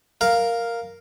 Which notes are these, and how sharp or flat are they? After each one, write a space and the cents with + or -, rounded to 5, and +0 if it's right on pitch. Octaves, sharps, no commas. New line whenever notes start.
A#4 +0 F5 +0